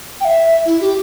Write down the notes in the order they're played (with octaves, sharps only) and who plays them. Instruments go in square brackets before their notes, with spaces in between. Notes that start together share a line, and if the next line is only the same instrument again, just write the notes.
[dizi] G5
E5
E4
G4